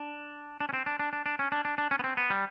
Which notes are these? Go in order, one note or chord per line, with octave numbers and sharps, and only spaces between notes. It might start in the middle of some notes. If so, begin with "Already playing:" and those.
Already playing: D4
D4
C#4
C4
D4
D4
D4
D4
C#4
D4
D4
D4
C#4
B3
C4
B3
G3